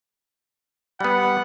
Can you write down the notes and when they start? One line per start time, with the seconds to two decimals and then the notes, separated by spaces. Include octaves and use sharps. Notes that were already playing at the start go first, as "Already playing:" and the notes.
1.01 G3 B3 F#5